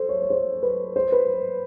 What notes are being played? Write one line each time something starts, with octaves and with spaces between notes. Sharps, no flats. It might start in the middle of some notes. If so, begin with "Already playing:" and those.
Already playing: A4 C5
C#5
C#5
C5
B4
C5
B4